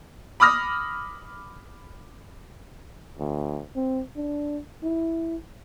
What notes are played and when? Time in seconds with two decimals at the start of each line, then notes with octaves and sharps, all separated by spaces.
0.40 B5 D6 D#6 F6 A#6
3.19 D2
3.75 C4
4.16 D4
4.83 E4